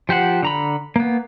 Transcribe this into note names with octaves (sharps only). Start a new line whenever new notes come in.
F3 G4 C5 F#5
D3 A#5 B5
A#3 B3